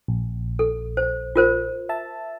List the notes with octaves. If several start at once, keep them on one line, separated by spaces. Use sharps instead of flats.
A#1
A4
C5
F4 A#4 C5
E5 A5